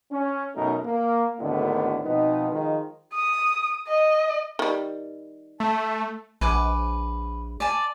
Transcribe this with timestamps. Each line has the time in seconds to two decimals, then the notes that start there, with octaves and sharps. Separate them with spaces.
0.12 C#4
0.55 F#2 B2 A3 D#4 A#4
0.85 A#3
1.40 G#1 D2 A2 D3 D#3 B3
2.05 B2 F3 B3 C4 D#4
2.51 D#3 F3 G#3
3.14 D#6
3.88 D#5
4.59 D#3 G3
5.60 A3 A5
6.41 A#1 B4 G#5 D6
7.60 D5 G#5 A5